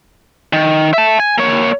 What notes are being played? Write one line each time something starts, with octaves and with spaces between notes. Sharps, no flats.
D#3
E5 A5
G#5
A#3 C#5